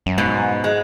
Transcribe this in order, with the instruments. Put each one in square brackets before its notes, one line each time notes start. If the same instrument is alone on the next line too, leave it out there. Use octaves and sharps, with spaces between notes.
[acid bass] F#2
[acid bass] G#2 [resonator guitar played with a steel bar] B2
[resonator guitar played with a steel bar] G#3